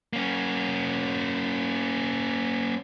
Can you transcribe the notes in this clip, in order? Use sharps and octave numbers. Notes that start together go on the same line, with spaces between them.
A#3 C#4